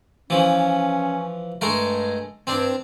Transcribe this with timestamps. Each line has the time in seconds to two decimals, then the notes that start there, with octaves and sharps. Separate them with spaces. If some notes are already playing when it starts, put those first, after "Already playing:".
0.30 E3 F3 C#4
1.61 G2 G#3 A3 A#4
2.47 G2 C4 D4